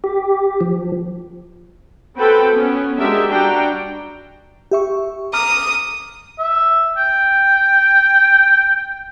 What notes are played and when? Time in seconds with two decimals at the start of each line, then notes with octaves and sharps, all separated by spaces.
0.04 G4
0.61 F3
2.17 C4 F#4 A4 B4 G5 B5
2.52 B3 C#4
2.98 G#3 D4 F#4 G4 A#4 E5
3.29 G3 D4 F#4 D5 G5 A#5
4.71 G4 E5 C#6
5.33 A#5 D6 D#6 F6
6.39 E5
6.97 G5